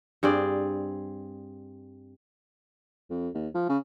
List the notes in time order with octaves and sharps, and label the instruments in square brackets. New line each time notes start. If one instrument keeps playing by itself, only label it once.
[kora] G2 C4 G#4 D5
[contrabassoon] F2
D#2
F3
C#3